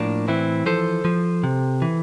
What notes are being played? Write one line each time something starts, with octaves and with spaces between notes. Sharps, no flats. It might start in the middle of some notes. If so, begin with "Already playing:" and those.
Already playing: A2 F3 A#3 D4
E3 C4 E4
F3 A4 C5
F3
C3
E3